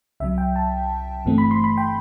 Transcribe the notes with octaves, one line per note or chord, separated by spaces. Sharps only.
C2 C3 F#3 E5
G5
A5
G1 G2 E3 A3 C4
B5
C6
B5
G5